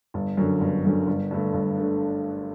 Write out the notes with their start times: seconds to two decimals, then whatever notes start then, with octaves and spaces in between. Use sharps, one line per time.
0.14 G1
0.37 F#2 D3
0.61 G1
0.85 F#2 D3
1.07 G1
1.31 G2 D3 A3
1.53 G1
1.78 D3 A3